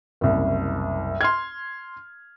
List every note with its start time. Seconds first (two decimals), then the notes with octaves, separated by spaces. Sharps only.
0.21 F#1 C2
1.21 C6 F6 G#6